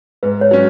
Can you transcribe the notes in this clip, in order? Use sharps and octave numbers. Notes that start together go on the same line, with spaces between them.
G#2 B4
C#5
F#3 C#4